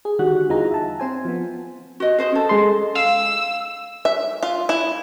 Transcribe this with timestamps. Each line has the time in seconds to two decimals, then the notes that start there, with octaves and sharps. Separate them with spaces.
0.05 G#4
0.19 D3 D#3 G3 F#4 F#6
0.49 E2 E3 D#4 F4 G#4 A#5
0.71 E5 A5
1.00 C4 C5 G#5
1.25 F3 B3
2.00 F#4 D#5
2.18 G#4 C5 D#5
2.32 C#4 A4
2.49 G#3 C6
2.95 F5 E6
4.05 E5
4.43 F4
4.69 E4